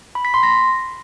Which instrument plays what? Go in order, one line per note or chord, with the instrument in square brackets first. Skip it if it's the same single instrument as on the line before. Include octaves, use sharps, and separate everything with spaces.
[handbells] B5
B6
C6
A#6